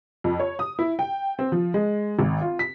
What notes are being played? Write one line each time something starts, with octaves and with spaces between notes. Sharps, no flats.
F2
C#5
D#6
E4
G5
C4
F3
G#3
G#1
F4
B6